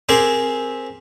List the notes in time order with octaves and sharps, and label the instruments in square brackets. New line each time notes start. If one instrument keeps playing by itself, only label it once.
[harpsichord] C4 G4 G#4 A#4 C5